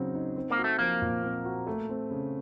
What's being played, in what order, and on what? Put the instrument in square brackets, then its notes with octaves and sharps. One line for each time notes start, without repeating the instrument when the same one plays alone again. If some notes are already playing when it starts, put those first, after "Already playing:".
Already playing: [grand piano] C#3 F#3 C4 D#4
D#4
C4
[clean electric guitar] A#3
[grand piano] F#4
[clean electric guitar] A3
[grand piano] F3 [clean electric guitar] A#3
[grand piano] A#2
C4
F#4
A3
C4
C#3